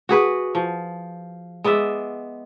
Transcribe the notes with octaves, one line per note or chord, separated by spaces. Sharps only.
F#4 G#4 B4
F3
G#3 B3 D5 E5